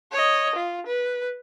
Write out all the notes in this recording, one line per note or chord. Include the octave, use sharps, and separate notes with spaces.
C#5 D#5
F4
B4